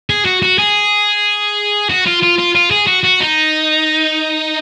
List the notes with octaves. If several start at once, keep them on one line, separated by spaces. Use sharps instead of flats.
G#4
F#4
F#4
G#4
F#4
F4
F4
F4
F4
G#4
F#4
F#4
D#4